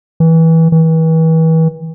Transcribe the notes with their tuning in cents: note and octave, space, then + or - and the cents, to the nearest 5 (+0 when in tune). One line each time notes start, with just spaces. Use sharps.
E3 -20
E3 -35